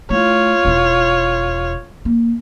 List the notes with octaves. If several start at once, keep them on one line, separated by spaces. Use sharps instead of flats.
A3 E4 F4 C#5
E1 E4
A#3